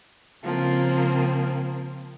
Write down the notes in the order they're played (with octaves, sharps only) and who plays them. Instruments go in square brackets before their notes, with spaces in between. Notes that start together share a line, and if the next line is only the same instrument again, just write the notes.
[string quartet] C#3 F3 A#3 C4